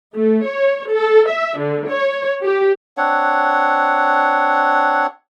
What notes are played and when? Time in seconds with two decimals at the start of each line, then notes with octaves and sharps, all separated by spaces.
0.15 A3
0.46 C#5
0.91 A4
1.29 E5
1.58 D3
1.88 C#5
2.41 G4
2.97 C4 D4 C#5 F#5